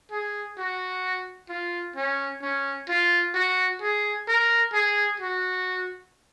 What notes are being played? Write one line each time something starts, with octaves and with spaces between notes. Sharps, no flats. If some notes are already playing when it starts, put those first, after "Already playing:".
G#4
F#4
F4
C#4
C#4
F4
F#4
G#4
A#4
G#4
F#4